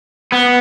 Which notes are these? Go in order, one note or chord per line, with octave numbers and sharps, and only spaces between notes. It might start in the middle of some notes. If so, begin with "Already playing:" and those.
B3